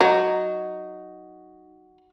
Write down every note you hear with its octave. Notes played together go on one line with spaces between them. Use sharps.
F#3 D#4 F#4